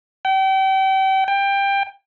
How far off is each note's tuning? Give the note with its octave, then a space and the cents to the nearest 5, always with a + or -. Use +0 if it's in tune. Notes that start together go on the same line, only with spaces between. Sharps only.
G5 -35
G5 +20